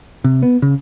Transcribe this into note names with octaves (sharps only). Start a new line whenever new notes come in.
C3
B3
C#3